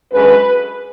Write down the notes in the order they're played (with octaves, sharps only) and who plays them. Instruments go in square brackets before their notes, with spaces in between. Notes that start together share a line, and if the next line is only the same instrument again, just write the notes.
[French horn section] F#2 D3 G#3 C#4 B4